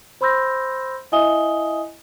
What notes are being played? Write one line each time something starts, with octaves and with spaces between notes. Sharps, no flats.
C5 B5 C6 E6 G6 A#6
E4 D#5 E5 G#5 D#6 G7